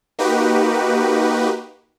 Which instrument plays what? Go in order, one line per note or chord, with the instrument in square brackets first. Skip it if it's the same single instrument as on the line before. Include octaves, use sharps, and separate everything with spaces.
[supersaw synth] A#3 D#4 F#4 G4 B4